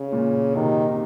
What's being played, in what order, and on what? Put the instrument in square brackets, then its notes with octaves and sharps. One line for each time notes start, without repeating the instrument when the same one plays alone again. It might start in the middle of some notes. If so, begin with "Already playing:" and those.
Already playing: [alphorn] C#3
[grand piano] A#2
[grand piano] C3 [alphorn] D#3